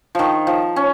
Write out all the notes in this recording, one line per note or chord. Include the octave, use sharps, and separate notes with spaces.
D#3 F3
F3
C#4